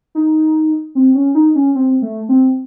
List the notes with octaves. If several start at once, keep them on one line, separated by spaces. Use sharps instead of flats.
D#4
C4
C#4
D#4
C#4
C4
A3
C4